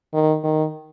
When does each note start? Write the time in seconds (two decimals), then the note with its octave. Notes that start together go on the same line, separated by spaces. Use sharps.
0.14 D#3
0.44 D#3